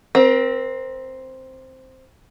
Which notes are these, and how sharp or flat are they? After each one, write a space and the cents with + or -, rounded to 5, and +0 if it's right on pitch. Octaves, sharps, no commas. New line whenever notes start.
C4 +0 A#4 +35